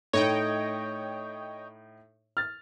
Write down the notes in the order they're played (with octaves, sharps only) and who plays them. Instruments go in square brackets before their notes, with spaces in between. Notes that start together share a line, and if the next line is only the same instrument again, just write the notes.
[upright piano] A2 A3 D#4 [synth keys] C#5 D#5 G5
[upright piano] F6 A6